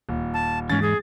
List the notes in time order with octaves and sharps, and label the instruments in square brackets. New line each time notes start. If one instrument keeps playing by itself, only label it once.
[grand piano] D#1
[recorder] A5
[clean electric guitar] E2 G#2 [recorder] C#4 [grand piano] A6
[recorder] G#4